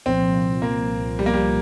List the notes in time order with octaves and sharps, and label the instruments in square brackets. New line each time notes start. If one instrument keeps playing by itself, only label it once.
[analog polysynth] C2 A#2 F3 [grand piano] C4
[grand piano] A#3
G3
A#3
G3